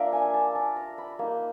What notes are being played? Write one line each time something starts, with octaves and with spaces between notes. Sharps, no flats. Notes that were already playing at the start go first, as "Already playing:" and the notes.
Already playing: A#3 D4 F4 D5 E5 A#5
G#5
A5
A5
A#5
B5
A#3 D#4